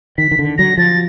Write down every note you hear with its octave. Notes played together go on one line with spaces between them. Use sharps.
D#3 B6
D#3
D3
F#3 A#6
F3 A6